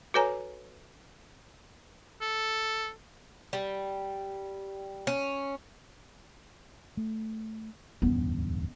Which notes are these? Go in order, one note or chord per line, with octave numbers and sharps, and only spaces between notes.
F#4 A4 B4 C#5 G#5 A#5
A4
G3
C#4
A3
D1 E2 G2 B3 C#4